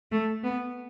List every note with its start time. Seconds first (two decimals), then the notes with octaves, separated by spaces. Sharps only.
0.12 A3
0.44 B3